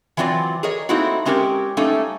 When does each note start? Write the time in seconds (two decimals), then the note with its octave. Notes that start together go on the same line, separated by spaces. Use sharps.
0.17 E3 F#3 C4 F4 D5
0.63 G#4 A#4 C#5 D#5
0.89 A3 A#3 C4 D#4 E4 F#4
1.25 G#3 C4 C#4 G4 A#4
1.77 G3 A3 A#3 C#4 D#4